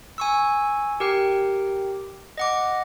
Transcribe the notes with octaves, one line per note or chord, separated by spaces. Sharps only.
G#5 C#6 E6
G4 A#4 G5
D#5 F#5 D6